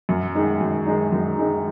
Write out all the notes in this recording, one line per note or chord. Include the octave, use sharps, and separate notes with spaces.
F#2
D#3 G#3 D#4
F#2
D#3 G#3 D#4
F#2
D#3 G#3 D#4